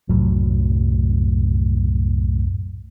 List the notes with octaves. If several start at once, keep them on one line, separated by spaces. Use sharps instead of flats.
C2 F#2 A2 F#3